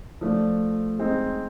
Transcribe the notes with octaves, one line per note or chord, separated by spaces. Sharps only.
F3 A3 D4
G#3 C4 D#4